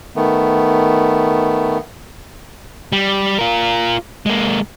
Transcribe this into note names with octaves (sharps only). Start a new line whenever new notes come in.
D#3 A3 B3
G3
F4 A#4
G#3 A#3